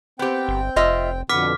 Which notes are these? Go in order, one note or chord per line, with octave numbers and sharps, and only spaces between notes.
B3 C4 G4 G5
G1
F1 F4 D#5 E5
F2 B2 D3 B3 D6 F6 B6